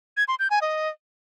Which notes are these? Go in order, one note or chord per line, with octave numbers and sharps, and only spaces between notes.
G#6
C6
G6
G#5
D#5